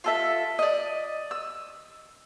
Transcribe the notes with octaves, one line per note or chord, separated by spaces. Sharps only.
F4 A4 E5
D5 D#5
E6